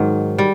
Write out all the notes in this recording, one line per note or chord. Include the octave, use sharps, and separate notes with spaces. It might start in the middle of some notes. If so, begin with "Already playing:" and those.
Already playing: G#2 D#3 F#3
G3